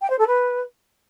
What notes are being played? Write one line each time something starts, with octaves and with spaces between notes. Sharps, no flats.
G5
C5
A4
B4